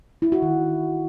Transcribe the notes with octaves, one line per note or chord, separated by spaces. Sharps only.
E4
F#4
D#3